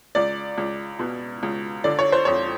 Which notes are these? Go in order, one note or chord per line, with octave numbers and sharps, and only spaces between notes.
C#2 D5
C#2
B2
C#2
D3 D5
C#5
C5
F2 C#5